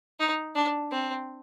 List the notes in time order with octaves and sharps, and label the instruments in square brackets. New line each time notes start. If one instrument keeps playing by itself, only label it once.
[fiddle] D#4
D4
C4